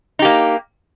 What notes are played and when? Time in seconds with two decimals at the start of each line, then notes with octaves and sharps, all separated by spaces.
0.19 D#4
0.22 G4
0.25 A#3